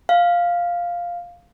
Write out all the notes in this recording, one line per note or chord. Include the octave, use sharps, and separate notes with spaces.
F5